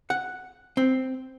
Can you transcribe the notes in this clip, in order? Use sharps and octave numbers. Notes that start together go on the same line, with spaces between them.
F#5
C4